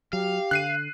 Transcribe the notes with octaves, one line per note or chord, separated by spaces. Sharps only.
F#3 G4 F5
D3 F#6 C7 D#7